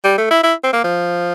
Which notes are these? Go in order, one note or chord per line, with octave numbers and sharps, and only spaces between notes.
G3
A3
E4
E4
C4
A#3
F3